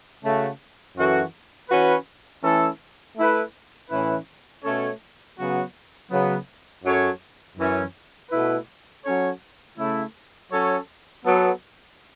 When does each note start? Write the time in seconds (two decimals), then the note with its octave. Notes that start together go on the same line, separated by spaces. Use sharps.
0.23 C#3 A3 F#4
0.96 F#2 E3 C#4 F#4 A4
1.70 E3 C#4 F#4 B4
2.43 E3 A3 C#4 E4 A4
3.16 A3 E4 B4
3.90 A2 E3 C#4 E4 B4
4.64 B2 A3 C#4 A4 C#5
5.37 C#3 F#3 B3 F#4
6.10 C#3 F#3 B3
6.84 F#2 F#3 C#4 A4 C#5
7.58 F#2 E3 C#4
8.31 B2 A3 E4 B4
9.05 F#3 C#4 A4 C#5
9.78 C#3 A3 E4
10.51 F#3 C#4 A4 C#5
11.25 F#3 B3 A4